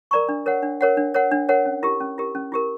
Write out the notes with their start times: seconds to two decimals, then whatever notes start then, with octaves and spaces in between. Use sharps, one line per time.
0.11 A#4 D5 A#5 C#6
0.29 D4
0.46 A#4 C#5 F#5
0.63 D4
0.81 A#4 C#5 F#5
0.97 D4
1.14 A#4 C#5 F#5
1.32 D4
1.49 A#4 C#5 F#5
1.66 C#4
1.83 E4 G4 A#4
2.00 C#4
2.18 E4 G4 A#4
2.35 C#4
2.52 E4 G4 A#4